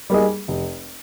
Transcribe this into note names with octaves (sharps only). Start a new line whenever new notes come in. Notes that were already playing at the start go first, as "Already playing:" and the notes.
G3 A#3 D#4 G#4
F1